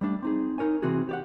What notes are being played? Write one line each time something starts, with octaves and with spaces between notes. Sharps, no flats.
G3 A3 D4
C4 D#4 G#4
D#4 A#4 C#5 G#5
C3 E3 C4 F#4 G#4
G4 D5 F#5